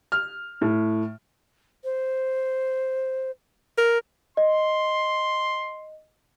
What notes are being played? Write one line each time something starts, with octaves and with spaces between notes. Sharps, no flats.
F6
A2
C5
A#4
D#5 C6